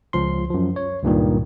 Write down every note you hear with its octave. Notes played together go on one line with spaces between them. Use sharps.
C#2 F3 C6
F#2 F3
C#5
C#2 G2 A#2 D#3